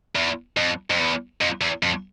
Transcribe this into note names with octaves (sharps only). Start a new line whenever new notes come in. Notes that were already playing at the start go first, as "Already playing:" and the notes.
E2
F2
F2
E2
F2
E2
F2